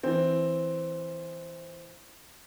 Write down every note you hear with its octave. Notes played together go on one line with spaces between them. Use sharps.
E3 C4